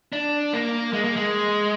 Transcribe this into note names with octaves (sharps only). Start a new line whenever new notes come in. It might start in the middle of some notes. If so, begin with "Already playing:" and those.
D4
A#3
G#3
A#3
G#3